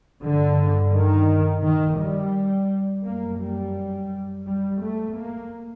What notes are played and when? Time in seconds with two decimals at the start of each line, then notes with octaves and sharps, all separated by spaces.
0.22 G2 D3
0.92 D#3
1.63 D#3
1.99 G3
3.05 F#2 A#3
3.40 G3
4.47 G3
4.83 A3
5.17 A#3